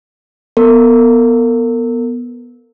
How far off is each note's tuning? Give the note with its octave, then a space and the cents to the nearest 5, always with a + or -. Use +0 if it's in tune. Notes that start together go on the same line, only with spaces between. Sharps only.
B3 -15 A#4 -40